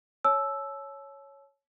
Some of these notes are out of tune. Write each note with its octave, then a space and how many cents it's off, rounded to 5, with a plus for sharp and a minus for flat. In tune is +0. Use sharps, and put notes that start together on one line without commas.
C#5 +0 A5 -40 E6 +0